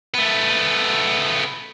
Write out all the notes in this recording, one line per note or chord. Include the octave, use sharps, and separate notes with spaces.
A3 B3